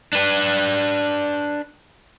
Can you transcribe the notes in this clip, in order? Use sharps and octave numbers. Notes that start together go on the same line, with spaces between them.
D4 B4